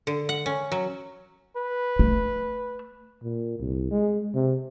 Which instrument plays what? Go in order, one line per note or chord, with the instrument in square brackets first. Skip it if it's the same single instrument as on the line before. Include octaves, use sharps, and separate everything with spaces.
[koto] D3
F#5
C#4
F#3
[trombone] B4
[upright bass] A3
[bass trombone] A#2
C2
G#3
C3